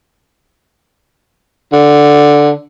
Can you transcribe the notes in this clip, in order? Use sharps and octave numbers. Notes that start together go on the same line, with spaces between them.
D3